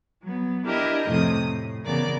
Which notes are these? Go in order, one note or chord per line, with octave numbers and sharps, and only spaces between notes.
F#3 B3
D4 E4 G4 A#4 D#5 E5
F2 A2 C3 A3 D#6
A2
C#3 E3 B3 A#4 D5 D6